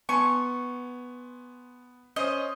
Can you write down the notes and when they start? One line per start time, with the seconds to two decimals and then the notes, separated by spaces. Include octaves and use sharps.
0.09 B3 G#5 C6 C#6
2.16 C#4 C5 D#5